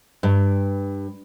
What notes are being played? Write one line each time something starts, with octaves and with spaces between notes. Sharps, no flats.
G2